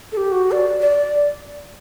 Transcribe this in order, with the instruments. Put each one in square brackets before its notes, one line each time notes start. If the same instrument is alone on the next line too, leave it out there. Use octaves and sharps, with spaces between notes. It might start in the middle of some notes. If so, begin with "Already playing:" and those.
[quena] A4
G4
F#4
D5
D5